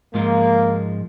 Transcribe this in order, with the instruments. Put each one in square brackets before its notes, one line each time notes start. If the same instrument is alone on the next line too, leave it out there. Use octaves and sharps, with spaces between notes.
[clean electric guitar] G#2 F3 G#3 [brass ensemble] A#3